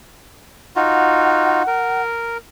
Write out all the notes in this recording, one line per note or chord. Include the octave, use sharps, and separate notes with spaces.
D#4 F4 F#4 F#5
A#4